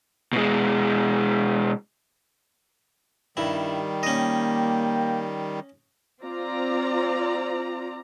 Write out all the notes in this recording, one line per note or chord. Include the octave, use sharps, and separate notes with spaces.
B2 G#3
G2 D#3 G3 E4
A#3 C#4 D#5 G5
C4 F4 D5 A#5